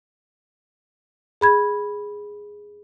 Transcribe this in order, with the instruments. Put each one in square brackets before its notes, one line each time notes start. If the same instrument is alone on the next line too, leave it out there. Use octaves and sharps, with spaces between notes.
[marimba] G#4 B5 G#6